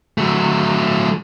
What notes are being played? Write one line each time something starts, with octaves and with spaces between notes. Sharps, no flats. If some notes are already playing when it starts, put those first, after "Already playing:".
F#3 A3